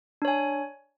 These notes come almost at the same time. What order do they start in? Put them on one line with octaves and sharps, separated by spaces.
D4 C#5 G#5